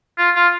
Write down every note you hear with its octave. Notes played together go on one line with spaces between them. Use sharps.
F4
F4